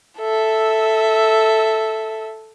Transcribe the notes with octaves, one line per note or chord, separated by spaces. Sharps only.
A4 E5